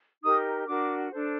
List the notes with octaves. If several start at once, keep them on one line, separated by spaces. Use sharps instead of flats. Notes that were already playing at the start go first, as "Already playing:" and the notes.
D#4 G4 A#4 D#6
D4 F#4 A#4 D6
D4 A4 C5